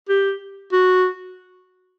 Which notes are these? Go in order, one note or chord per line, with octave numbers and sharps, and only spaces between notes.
G4
F#4